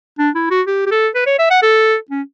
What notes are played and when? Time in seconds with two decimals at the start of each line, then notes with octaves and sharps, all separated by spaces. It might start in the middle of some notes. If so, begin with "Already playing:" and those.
0.19 D4
0.35 E4
0.51 F#4
0.67 G4
0.86 G4
0.91 A4
1.15 B4
1.26 C#5
1.39 E5
1.50 F#5
1.63 A4
2.11 C#4